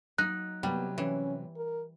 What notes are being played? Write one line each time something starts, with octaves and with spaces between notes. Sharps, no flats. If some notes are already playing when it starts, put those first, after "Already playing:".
F#3 A#3 D#4 F#6
C3 F#3 G3 A#3 B3
E3 C#4
A#4